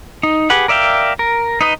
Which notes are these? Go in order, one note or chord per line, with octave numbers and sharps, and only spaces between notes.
D#4
G4 G#4 B4 F#5
A#4 D5 E5 F5 G5
A#4
D#4 B4 D#5